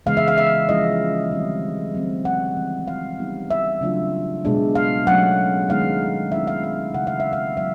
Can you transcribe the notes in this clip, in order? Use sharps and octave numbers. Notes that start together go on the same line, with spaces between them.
C#3 E3 G#3 B3 F5
E5
F5
E5
F3 G#3 C#4 E4 D#5
D#3 G3 C4
D#3 F#3 A3 C4
F#5
E3 G3 C4
F5
G3 B3 D#4
E5
C#3 F#3 A3 D4 F4
B2 G#3 B3 D4
F5
F#3 A3 C#4 F#5
D#3 G#3 B3 D#4 F5
D#3 G#3 C#4 E4 E5
F5
F5
C#3 E3 A3 C4 F#5
F5
E5
F5
F#3 B3 E5